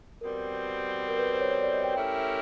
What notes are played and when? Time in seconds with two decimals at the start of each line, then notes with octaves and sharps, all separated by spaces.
0.21 B2 G3 C4 A#4
1.08 A#4
1.18 B4
1.32 C5
1.40 C#5
1.51 C#5
1.62 D5
1.73 D#5
1.84 G5
1.95 A3 C#4 E4 G4 A#4 G5